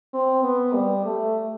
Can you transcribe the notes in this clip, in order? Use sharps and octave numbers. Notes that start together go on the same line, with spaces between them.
C4
B3
G3
A3